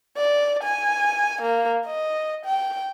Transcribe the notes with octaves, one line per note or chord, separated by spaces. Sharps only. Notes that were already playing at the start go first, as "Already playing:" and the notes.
D5
G#5
A#3
D#5
G5